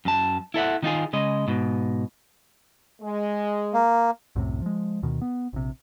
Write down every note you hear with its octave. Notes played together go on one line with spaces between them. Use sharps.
F#2 A5
E4 A4 E5 F#5
D#3 D#4 F4 G#4
C#3 G#3 D#5
G#2 B2
G#3
A#3
C2 F#2 A2 C3
F3 G#3
D2 B2 D#3
B3
A#1 C3